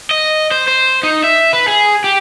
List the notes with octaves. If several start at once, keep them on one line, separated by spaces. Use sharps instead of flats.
D#5
C5
C5
D#4
E5
B4
G#4
G4